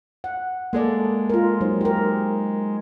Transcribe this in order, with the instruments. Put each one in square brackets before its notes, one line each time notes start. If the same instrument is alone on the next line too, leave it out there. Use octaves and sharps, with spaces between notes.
[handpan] F#5
[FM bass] G#3 [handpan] A#3 A4 D5
[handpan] F4 A#4
F#3 D#4 C5
G4 A#4